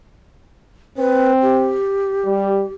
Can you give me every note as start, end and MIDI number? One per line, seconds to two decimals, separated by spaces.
0.98 1.78 60
0.98 1.32 71
1.42 2.73 67
2.25 2.64 55